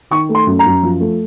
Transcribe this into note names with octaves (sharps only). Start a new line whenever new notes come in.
D#3 C#6
A3
C6
F#2
A#5
F#2
F3
A3